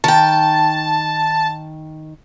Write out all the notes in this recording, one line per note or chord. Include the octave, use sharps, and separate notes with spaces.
D#3 G5 A5